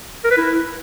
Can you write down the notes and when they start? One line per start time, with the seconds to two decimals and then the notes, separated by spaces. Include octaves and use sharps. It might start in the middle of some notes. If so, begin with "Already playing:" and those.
0.24 A#4
0.31 B4
0.37 E4